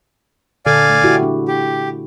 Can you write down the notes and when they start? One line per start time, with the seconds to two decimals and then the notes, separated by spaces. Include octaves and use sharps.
0.66 A#2 D3 A4 D5 F5 G#5
0.90 A3
1.03 E4 F#4 G4
1.23 D4
1.48 G4